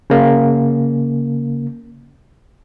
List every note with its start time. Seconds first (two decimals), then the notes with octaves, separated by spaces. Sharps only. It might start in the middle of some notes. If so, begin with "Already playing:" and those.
0.10 C#3 A#3